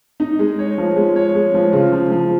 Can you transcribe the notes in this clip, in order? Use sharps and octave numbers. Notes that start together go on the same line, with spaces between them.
D#4
G#3
C#5
F3
G#3
C#5
G#3
F3
C#3
F3
F3